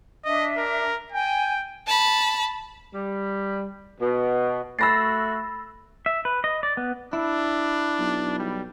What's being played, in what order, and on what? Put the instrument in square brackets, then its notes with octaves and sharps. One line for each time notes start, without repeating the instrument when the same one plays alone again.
[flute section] D4 E5 [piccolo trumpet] D#5
[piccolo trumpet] A#4
[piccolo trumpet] G5 [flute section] G#5
[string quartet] A5 B5
[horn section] G3
B2
[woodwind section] A3 F#4 [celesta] B5 A6 [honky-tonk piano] E6 A#6 C7
[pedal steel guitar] E5
B4
D#5
D5
B3
[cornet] D4 [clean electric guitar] E4
[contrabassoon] B1
[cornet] G3